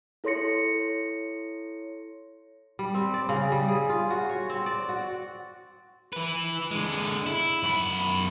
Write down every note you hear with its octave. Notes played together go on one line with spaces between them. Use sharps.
E4 A4 C#5 C6 A#6 C#7
G3
C4
D5
C#3
G3
G#4
F4
F#4
C#5
C4
D5
F#4
E3 B4
D3 G#3
E4
F#2 B5